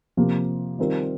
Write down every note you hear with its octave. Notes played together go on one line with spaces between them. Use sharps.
C3 F3 A#3
D#3 G3 C4 F4 A#4